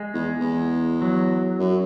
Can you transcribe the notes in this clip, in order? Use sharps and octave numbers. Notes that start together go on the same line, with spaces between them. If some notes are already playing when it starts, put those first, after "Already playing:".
Already playing: G#3
E2
E2
F#3
F#2